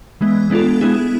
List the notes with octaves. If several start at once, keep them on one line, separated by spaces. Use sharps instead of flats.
E3 G#3 B3
G#3 B3 D4 F4 A4
G#3 B3 E4 G#4